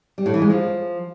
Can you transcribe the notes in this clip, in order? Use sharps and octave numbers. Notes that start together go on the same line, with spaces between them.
G3
A2
E3
G#3
F3